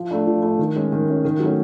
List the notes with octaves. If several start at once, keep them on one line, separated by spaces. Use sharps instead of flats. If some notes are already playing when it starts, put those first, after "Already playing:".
Already playing: F3
A3 D4
F3
A3 D4
D#3
G#3 C#4
D#3
G#3 C#4
D#3
F#3 A3 C#4